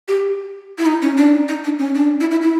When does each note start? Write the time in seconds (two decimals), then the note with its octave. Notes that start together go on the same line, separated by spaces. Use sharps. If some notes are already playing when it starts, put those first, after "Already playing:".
0.08 G4
0.78 E4
0.86 D#4
1.02 C#4
1.17 D4
1.33 D#4
1.49 D#4
1.64 D4
1.79 C#4
1.95 D4
2.21 E4
2.31 E4
2.42 E4